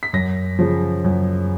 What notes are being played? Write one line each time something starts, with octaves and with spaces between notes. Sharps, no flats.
B6
F#2 A#6
C#3 F3
F#2